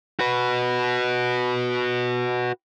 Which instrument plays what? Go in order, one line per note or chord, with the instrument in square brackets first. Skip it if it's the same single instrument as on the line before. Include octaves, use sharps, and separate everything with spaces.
[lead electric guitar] F#4 B4